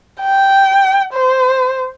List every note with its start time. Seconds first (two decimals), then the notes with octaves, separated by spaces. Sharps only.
0.21 G5
1.13 C5